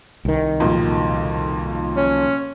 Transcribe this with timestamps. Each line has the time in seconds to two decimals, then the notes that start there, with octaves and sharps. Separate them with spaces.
0.25 C2 D#3
0.60 B1 F2 A#2
1.97 C#4